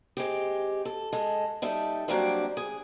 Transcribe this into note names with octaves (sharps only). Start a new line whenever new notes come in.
G#3 C4 G4
A4
G#3 A4
G3 D#4 A4 E5
F#3 G3 A#3 C4 D4 G4
G#4